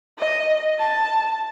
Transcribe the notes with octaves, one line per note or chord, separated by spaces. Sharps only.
D#5
A5